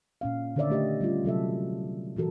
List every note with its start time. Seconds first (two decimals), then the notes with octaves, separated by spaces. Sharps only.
0.21 A#2 C#4 F5
0.56 D3 D#3 A#4 C#5 D5 E5
0.70 A3 G4 D#5
1.01 G3 C#4 F4
1.24 C3 F#3 A4 E5
2.16 A#2 E3 F#4 A4 A#4